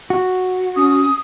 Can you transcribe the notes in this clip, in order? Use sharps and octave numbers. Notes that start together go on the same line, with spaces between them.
F#4
C#4 D#6